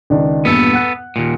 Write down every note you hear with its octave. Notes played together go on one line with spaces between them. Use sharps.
C#2 D#3 D4
E2 G2 A#2 B3 A4
F#5 F#6
D#2 A#2